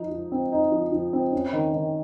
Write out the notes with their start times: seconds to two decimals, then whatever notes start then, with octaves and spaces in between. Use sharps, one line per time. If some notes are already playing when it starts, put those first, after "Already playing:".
Already playing: F3 D#4
0.11 F3
0.32 C4
0.52 D#4
0.72 F3
0.92 F3
1.13 C4
1.32 C#4
1.53 D#3
1.73 D#3